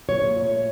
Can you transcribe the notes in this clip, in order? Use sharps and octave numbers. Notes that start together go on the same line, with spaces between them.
A#2 C#5
A#2
A3